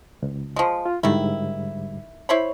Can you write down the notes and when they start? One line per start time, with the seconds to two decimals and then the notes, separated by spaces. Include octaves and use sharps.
0.22 C#2
0.56 F3 G#3
0.86 F4
1.03 G#2 D3 D#3 G3 E4
2.29 E4 C5 C#5 B5